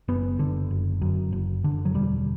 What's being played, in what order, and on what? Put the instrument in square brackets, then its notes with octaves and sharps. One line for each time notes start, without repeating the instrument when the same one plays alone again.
[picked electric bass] F#1 B3
D3
F#1
F#2
F#1
D3
F#3
E1 G3